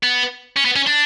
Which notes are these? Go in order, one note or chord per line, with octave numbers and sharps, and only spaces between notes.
B3
C#4
B3
C#4
D4